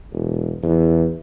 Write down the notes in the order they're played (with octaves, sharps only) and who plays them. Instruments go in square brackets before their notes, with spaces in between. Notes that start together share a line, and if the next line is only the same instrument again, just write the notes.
[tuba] E1
E2